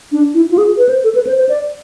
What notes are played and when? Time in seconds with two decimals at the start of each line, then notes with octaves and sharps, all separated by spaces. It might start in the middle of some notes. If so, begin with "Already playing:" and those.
0.12 D4
0.34 E4
0.51 F4
0.58 G#4
0.77 B4
0.89 C5
1.04 A4
1.15 B4
1.27 C5
1.38 C5
1.49 D5